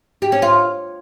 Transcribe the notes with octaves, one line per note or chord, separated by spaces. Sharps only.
G4
C#4
F4